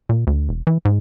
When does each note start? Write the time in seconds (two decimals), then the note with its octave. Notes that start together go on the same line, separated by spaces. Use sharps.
0.09 A#2
0.27 D2
0.49 E1
0.67 E3
0.85 G#2